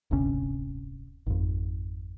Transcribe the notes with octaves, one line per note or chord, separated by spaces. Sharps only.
D1 G1 C3 C#4
G#1 F2